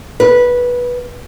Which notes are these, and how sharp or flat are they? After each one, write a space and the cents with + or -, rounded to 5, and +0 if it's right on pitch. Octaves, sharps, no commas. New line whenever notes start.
B4 -15